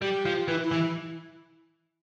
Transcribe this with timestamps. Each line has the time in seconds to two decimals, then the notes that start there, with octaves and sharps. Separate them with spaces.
0.02 G3 G4
0.25 F3
0.48 E3 E4
0.62 E4
0.71 E3